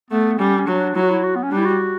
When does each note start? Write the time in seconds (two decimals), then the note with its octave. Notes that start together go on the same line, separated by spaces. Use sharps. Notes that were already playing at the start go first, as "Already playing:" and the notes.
0.11 A3 B3
0.38 G3 C#4
0.59 C#4
0.67 F#3 D4
0.95 F#3 E4
1.02 F#4
1.10 E4
1.24 F#4
1.36 B3
1.44 C#4
1.51 G3 D4
1.58 E4
1.65 F#4